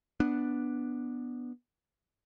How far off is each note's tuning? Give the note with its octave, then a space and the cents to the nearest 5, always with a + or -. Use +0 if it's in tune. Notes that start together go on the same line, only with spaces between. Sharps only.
B3 -5 D4 +0